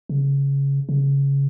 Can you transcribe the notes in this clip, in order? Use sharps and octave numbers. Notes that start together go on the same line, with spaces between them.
C#3
C#3